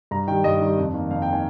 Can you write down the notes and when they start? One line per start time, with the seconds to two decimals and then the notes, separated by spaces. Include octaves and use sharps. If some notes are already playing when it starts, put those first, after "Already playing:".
0.11 G2 A#5
0.28 D#3 G5
0.32 G3
0.44 G2 D#5
0.61 D#3 G3
0.78 F2
0.94 D#3 A#3
1.11 F2 F5
1.22 G5
1.27 A#3
1.32 D#3 G#5